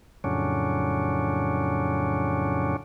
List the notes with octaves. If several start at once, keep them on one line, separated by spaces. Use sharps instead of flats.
F2 A2 C#3 F#3 C#4 D4